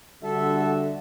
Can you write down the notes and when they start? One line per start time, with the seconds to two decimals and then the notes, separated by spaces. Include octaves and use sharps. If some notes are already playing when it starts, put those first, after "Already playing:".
0.23 D3 G3 F#4 A4 E5